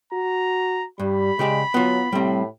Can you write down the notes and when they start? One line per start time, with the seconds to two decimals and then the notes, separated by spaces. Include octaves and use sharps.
0.13 F#4 A#5
1.00 G2 G3 B5
1.39 C#3 G#3 G4 D5
1.74 F#3 B3 F4
2.13 A2 G3 C4